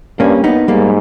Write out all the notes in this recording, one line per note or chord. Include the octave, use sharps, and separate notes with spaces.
G2 A#3 C#4
B3 D#4
G#2 G3 A#3